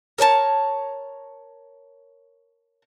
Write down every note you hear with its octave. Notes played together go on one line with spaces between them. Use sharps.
A#4 C#5 G#5 A5